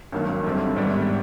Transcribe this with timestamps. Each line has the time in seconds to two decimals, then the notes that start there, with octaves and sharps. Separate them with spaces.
0.12 G#1 G2 D#3 F#3 A#3
0.44 F#2 D3 G3 C4
0.76 G#2 D#3 G3 B3 E4